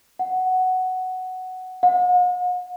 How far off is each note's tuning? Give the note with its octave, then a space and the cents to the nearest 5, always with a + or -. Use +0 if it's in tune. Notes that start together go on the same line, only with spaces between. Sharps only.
F#5 +5
F#5 -45